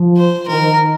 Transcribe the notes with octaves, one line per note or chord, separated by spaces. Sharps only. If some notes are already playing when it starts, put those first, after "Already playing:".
Already playing: F3
C5
D#3 A#4